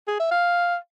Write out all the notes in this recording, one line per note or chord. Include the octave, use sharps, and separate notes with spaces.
G#4
E5
F5